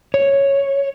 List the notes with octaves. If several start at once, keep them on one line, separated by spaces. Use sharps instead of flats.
C#5